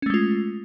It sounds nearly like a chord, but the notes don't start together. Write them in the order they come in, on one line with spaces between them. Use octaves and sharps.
C#4 A3 G#3 F4